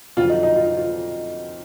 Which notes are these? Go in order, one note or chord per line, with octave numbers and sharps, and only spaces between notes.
F2 D3 F#3 F4
D#4
D#4
F4
D#4
F4